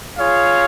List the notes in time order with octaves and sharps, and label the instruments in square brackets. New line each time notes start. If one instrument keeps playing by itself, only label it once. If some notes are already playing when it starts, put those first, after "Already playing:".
[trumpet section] F4 G#4 C#5 F5